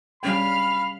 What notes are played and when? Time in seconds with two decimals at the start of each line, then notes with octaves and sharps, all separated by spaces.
0.23 G3 C#4 F5 G5 B5